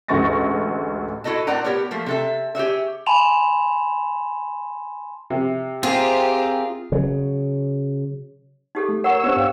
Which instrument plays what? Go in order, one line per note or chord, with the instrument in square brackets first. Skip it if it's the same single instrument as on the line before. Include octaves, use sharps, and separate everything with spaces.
[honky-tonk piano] A1 D2 G#3 C#6 A6 A#6
[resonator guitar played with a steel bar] E4 F#4 A4 D#5 A5
A2 C4 A#4 D5 F#5 A#5
B3 G4 A#4 C#5
F3 A3 A#3
C3 A4 E5
G4 G#4 C#5 E5
[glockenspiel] G#5 A5 B5 C6 E7 F7
[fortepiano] C3
[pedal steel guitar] C4 G#4 A#4 [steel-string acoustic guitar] F4 [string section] G4 C5
[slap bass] C#3 F#3
[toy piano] D#4 G4 A4
[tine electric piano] A3
[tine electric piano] A#4 [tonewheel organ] C#5 E6 [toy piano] F#5 C#6
[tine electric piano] B3 D4 [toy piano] F4 G4 C5
[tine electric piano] G2 F5 G5